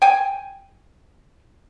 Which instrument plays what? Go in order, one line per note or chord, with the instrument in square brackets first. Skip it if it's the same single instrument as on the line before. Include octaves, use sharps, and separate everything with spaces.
[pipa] G5 G#5